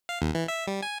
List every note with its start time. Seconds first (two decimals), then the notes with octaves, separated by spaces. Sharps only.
0.09 F5
0.22 D#2
0.35 E3
0.48 E5
0.67 G3
0.82 G#5